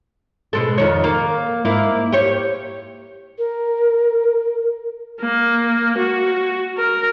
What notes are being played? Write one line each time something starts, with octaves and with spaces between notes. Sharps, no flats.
B2 G#3 A4
F2 D#3 C#5
A#3
G#2 A#3 E4
G4 C#5
A#4
A#3
F#4
A#4